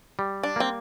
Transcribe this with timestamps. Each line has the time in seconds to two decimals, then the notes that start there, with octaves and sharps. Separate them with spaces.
0.19 G3
0.43 D4
0.56 A#3 C4